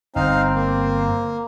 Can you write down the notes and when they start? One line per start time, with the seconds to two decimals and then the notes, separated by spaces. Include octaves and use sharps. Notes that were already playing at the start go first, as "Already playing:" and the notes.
0.16 G1 C4 D#4 F5
0.55 A#3